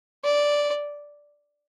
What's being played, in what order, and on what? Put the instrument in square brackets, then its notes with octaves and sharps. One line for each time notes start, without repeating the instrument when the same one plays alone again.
[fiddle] D5